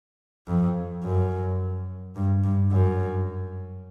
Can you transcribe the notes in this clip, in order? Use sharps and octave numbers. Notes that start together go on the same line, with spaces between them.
F2
F#2
G2
G2
F#2